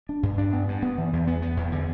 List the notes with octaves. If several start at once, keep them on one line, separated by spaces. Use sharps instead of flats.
D4
G2
D4
B3
G2
B3
E3
E2
B3
B3
E2
D3